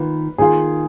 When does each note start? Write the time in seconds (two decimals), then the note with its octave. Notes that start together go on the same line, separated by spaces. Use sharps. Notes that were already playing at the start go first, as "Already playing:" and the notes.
Already playing: D#3 A#3 F4 B4
0.38 D#3 A#3 F4 G#4